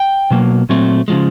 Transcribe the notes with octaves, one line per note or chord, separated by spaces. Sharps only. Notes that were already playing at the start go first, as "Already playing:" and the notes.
Already playing: G5
B2 F#3 A#3
A#2 F#3 A3 C4
C#3 F3 G#3